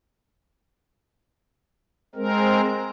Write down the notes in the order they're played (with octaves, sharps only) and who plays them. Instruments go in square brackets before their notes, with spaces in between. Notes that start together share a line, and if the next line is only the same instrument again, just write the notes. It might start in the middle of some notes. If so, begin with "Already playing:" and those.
[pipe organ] G#3 C4 A#4